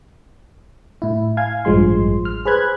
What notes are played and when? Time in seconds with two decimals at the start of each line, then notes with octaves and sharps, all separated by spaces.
1.02 A2 E4
1.37 F5 G#5 G#6
1.65 A1 G2 F3 G#3 C6
2.25 F6
2.45 G#4 B4 C5 B5 F#6 G#6